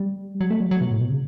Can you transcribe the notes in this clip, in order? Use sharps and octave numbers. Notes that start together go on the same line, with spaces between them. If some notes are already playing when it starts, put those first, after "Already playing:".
Already playing: G3
F#3
A3
F#3
F#3
B2
A2
B2
C#3